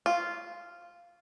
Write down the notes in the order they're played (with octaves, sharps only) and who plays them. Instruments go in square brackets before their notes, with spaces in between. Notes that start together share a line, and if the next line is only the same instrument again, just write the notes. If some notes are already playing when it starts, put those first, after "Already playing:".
[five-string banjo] F4